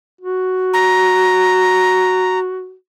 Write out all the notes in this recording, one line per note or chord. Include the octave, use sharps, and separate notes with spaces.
F#4
A#5